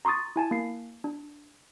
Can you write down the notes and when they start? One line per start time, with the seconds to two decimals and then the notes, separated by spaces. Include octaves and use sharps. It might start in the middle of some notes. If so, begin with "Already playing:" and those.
0.05 A#5 C6 C#6 D#6 A6
0.36 E4 G#5 A5
0.51 A#3 C7
1.04 D4